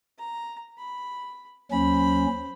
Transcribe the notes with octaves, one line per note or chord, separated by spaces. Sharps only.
A#5
B5
D#2 F#3 C#4 C5 B5